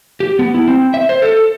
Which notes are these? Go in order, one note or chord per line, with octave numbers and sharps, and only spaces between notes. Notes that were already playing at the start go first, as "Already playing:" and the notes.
G4
B3
E4
C4
E5
C5
A4